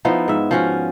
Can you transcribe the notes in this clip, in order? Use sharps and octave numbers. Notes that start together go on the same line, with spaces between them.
F3 B3 D#4 E4
G#2 E5
F3 C#4 F#4